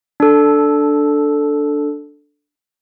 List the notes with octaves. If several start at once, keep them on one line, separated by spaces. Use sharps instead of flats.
D4 A4